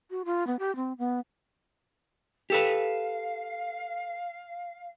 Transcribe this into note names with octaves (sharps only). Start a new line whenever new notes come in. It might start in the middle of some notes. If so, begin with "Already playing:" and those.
F#4
F4
B3
G4
C4
B3
G4 A4 B4 F5